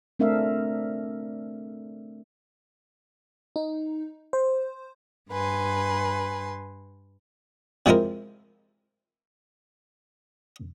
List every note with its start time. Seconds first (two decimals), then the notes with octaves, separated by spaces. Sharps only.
0.19 A3 C4 D4 A#4 E5 F5
3.56 D#4
4.33 C5
5.30 G2 B4 G#5 C6
7.86 C3 F3 G#3 E4 A#4